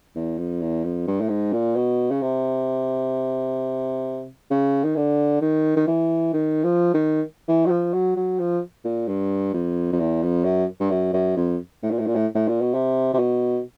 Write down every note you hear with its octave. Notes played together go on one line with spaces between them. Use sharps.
E2
F2
E2
F2
G2
A2
G#2
A#2
B2
C#3
C3
C#3
D#3
D3
D#3
D#3
E3
D#3
F3
D#3
E3
F#3
F3
F#3
F#3
F3
A#2
G2
F2
F2
E2
F2
F#2
G2
F#2
F#2
F2
A2
A#2
A2
A#2
A2
A2
A#2
B2
C3
C3
B2